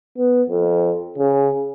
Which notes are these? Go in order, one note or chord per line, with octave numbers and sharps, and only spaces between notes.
B3
F2
C#3